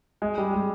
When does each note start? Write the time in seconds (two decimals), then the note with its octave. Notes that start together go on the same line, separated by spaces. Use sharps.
0.22 G#3
0.38 G3
0.53 G#3